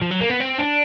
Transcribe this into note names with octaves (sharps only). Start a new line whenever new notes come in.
F3
F#3
A#3
B3
C4
D4